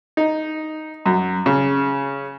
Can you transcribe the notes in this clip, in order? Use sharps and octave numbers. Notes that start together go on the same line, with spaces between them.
D#4
F#2
C#3